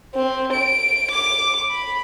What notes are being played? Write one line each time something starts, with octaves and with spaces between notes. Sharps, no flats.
C4
D7
D6
B5